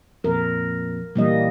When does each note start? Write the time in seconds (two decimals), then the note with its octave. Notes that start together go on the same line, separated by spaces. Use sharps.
0.24 F2 A#2 A#4
1.16 A#2 E3 G3 A#3 D#5